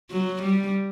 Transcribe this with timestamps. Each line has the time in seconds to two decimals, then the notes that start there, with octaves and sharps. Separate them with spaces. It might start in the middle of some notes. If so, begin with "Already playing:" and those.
0.11 F#3
0.42 G3